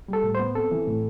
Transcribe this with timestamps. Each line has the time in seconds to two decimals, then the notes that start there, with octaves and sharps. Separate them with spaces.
0.08 G3 A4
0.24 A2
0.35 B3 C5
0.55 C4 A4
0.72 E3
0.87 A2